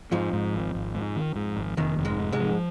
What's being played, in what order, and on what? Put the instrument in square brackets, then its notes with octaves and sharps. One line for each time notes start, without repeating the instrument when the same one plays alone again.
[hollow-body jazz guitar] F2 F3 [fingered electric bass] G#2
[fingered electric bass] G#2
G#1
G#1
G#2
D#3
G#2
G#1
[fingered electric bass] F1 [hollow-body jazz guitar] D#2 D#3
[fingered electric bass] F1
[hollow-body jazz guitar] G#2 G#3
[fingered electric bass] C3
[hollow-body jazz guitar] G#2 G#3
[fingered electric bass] F3